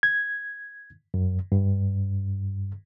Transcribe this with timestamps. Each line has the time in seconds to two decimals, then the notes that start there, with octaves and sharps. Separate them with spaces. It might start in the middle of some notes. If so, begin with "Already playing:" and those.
0.03 G#6
1.14 F#2
1.52 G2